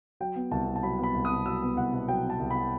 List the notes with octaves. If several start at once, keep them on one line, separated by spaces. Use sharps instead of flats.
F#3 G5
B3
C2 A5
B2
A5
F#3 B5
B3 B5
C2
D#6
B2
F#3 E6
B3
C2 F#5
B2
F#3 G5
B3
A5
C2
B2 B5